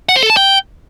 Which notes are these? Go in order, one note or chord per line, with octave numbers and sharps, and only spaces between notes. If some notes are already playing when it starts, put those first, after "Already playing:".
F#5
C5
A4
A5
G5